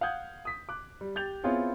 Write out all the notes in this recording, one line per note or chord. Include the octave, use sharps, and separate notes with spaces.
F5 F#5 D#6 G6 G#6
D#6 B6
D6 F#6
G3
G4 G6 A6 F7
B3 C4 E4 F4 G#4 C#5